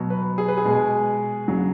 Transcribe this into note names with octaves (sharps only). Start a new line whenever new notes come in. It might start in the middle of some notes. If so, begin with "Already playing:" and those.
Already playing: B2 F#3
B4
G#4
B4
G#4
B2 G#3
C#3 F#3